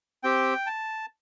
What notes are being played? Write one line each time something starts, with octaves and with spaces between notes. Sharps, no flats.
C4 G4 G5
A5